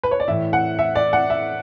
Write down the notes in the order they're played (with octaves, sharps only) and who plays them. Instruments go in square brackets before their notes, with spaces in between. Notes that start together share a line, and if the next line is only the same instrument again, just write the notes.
[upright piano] B4
C#5
D5
A2 E3 E5
F#5
E5
D5
F#5
E5